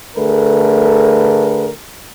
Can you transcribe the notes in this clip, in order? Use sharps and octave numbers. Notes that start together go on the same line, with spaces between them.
D3 A3 G#4 A#4 B4